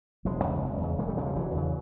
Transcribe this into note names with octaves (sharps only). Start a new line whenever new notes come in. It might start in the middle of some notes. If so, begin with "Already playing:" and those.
E1 F#3 G#3
E2 C#3
E1
E2 C#3
E1 G#3 A#3
G3 A3
E2 C#3 F#3 G#3
F3 G3
E1 E3 F#3
E2 C#3